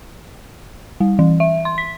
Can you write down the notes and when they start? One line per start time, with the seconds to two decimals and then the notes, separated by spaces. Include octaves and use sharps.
1.00 G3
1.19 E3
1.40 E5
1.65 C6
1.78 B6